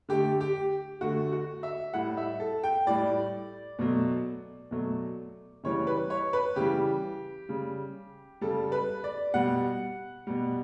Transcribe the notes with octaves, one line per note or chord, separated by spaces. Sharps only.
D3 A3 G4
G4
D3 A3 F#4
F#4
E5
A2 G3 F#5
E5
A4
G5
A2 G3 D5
B2 F#3 A3
B2 F#3 A3
C#3 E3 G3 C#5
B4
C#5
B4
C#3 E3 G3 G4
C#3 G3
C#3 G3 A4
B4
D5
B2 G3 F#5
B2 G3